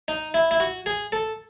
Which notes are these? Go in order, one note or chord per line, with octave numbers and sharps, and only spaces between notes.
D#4
E4
E4
F#4
G#4
A4